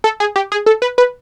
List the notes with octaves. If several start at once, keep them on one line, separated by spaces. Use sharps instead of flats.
A4
G#4
G4
G#4
A4
B4
B4